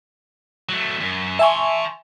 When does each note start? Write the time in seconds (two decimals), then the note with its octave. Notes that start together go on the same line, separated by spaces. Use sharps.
0.69 F#3 A3
1.01 F#2
1.39 E5 G#5 A5 C6 C#6